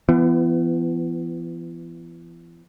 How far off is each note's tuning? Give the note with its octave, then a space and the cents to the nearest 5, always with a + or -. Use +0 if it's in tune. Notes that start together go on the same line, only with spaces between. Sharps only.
E3 +40 B3 +20